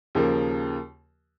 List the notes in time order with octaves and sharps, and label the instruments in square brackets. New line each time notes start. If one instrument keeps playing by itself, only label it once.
[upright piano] D#2 C#3 F3 A#3